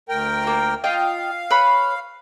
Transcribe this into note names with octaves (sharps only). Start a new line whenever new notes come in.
D2 A#4 G5
A#3 F4
F4 D#5 F5 G5
B4 C#5 B5